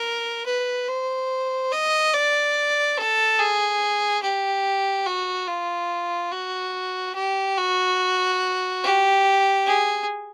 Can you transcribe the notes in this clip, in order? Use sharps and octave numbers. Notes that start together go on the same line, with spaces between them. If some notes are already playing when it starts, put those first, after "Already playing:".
Already playing: A#4
B4
C5
D#5
D5
A4
G#4
G4
F#4
F4
F#4
G4
F#4
G4
G#4